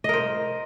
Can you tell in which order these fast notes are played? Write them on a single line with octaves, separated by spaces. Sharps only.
D#5 A#4 C5